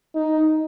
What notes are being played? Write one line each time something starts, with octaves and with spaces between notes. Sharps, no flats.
D#4